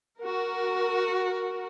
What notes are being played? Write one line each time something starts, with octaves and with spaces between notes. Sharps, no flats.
F#4 A#4